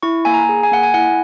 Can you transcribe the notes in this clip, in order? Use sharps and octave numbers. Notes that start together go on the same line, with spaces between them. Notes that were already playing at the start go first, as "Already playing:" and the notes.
E4 C#6
A#3 G#5
A#5
G#4
G#5
A#3 F#5
G#5
E4 F#5